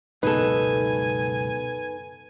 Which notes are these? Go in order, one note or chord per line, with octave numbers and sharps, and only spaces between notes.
C#2 F#2 B2 D#4 A4 B4 G#5